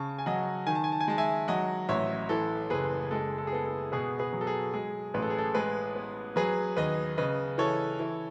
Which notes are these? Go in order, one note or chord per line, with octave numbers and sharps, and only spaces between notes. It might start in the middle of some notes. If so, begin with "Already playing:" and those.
Already playing: C#3 A5 C#6
G#5
F#3 D#5 F#5
D#3 G#5
A5
G#5
A5
G#5
G#3 A5
E5 G#5
F#3 D#5 F#5
A1 C#5 E5
E3 A4
F#1 G#4 B4
G#3 A4
A4
G#4
B3 A4
A4
B2 G#4 B4
G#4 B4
F#3
A4
G#4
G#3 G#4
A1 B4
A4
G#4
A4
G#3 G#4 B4
B3
F#3 G#4 B4
D#2 B4 D#5
C#3 B4 D#5
E3 A4 C#5
E3